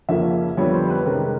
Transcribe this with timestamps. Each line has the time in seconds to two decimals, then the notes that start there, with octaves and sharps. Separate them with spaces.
0.09 F2 C#3 F3 A#3 C#4 E5
0.57 F2 D3 G3 B3 C#5
0.74 C5
0.90 B4
1.06 C3 D#3 G#3 C#4 A#4